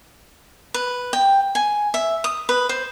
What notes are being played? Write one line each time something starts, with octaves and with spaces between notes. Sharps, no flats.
B4
G5
G#5
E5
D#6
B4
C5